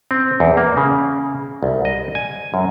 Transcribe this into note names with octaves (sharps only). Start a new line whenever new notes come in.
C4
E2
A#3
C#3
C2
D#5
G#5
F#2